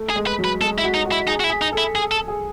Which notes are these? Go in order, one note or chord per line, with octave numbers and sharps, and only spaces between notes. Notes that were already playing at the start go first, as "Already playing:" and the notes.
Already playing: A3
G#4
G#3
B4
F#3
B4
G#3 A4
E4
F#4
D#4
F#4
E4
D#4 G#4
F#4
E4
G#4
D#4
A4
E4
G#4
A4
G#4